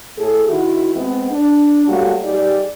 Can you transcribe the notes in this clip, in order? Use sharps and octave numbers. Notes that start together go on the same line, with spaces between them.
A2 G#4 A4
D#3 E4 F#4
G#3 B3 C4
D4
F#3 G3 A3 A#3 F#4 G4
G3 D#4 G4 G#4 D5